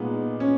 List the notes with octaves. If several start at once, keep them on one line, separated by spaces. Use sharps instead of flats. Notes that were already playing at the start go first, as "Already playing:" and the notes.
Already playing: A#2 G#3 B3 D#4
C#4